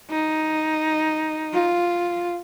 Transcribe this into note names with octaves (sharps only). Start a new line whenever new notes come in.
D#4
F4